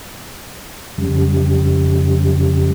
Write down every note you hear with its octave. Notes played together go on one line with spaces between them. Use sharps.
F2 C#3 G3